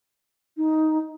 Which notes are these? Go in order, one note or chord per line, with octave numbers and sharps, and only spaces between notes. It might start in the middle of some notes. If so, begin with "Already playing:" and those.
D#4